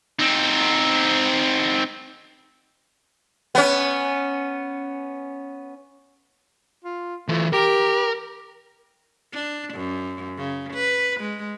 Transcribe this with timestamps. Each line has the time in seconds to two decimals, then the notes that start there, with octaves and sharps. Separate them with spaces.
0.19 C4 D#4
3.55 B3 C#4
6.84 F4
7.28 E3 A3 F4
7.53 G4 A#4
9.33 D4
9.74 F#2
10.37 C#3
10.74 B4
11.20 G#3